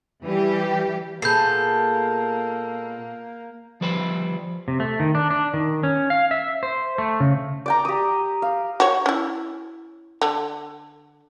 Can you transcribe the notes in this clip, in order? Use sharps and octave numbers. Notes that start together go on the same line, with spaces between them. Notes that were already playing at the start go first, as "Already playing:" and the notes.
E3 G3 G4
A#2 G#3 A#3 B3 A4 G6 C7
F3 G3 B4 C5 G#5 B5
C3
A3
D#3
D4
D4
D#3
C#4
F5
E5
C5
A3
C#3
D5 G5 A#5
G4 D#6
F5
F#4 C#5
C#4 E4
D3